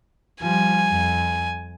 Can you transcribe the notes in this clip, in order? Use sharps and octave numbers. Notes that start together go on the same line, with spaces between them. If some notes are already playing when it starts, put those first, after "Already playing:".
F3 G3 G#5
F2